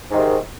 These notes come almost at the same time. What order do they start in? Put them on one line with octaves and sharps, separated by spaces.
G#2 D#3 C3